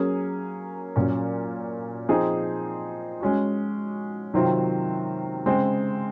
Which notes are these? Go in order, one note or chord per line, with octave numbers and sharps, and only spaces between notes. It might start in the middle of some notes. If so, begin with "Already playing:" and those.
Already playing: F#3 A#3 C#4 G#4
A#2 F#3 C#4
F3 C4 D#4 G#4
G#3 C#4 F#4
C3 D#3 F#3 C4 F4
C#3 G#3 C4